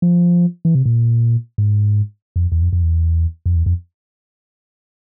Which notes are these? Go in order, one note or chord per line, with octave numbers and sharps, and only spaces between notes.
F3
E3
C3
A#2
G#2
F2
E2
F2
F2
E2
F2
E2
F2